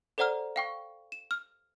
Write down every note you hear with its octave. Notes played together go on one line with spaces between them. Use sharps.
A4 C5 D5 F#5 A#5 F6
F5 G5 C#6
E7
F6